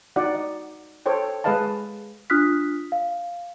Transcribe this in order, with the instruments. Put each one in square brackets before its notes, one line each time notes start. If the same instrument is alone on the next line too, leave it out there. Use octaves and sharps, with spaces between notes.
[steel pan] D#4 F#4 D5 F#5
D#5
A4 C5 C#5 G5
G#3 G#4 B4 D#5 F5 A5
[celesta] D4 F4 D#6 F6 F#6 B6
F5